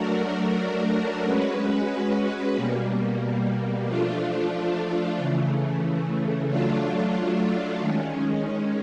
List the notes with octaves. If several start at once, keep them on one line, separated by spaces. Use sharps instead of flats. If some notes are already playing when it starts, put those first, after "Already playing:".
Already playing: F#3 A3 D4 F#4 A#4
G#3 C#4 F#4 B4
B2 G3 A#3
F3 A3 D4 F4
C#3 E3 A3
F#3 A3 D4 F4
D#3 G#3 C#4